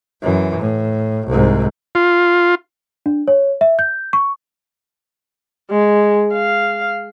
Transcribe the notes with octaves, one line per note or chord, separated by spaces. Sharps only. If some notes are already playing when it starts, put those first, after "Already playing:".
F#2 E3
A2
C2 G#2
F4
D4
C#5
E5
G6
C#6
G#3
F5